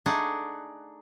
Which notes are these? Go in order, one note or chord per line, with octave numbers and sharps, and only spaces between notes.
A3 D4 D#4 G#4 D5 F#5